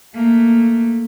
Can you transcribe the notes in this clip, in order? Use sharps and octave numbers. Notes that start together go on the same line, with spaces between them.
A3 A#3